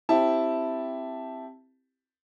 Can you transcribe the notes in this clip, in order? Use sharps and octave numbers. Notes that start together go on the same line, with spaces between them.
C4 E4 G4 A5